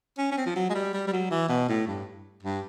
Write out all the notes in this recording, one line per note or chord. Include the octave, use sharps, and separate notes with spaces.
C#4
C#4
C4
F3
F#3
G#3
G3
G3
G3
F#3
E3
B2
A2
G2
G2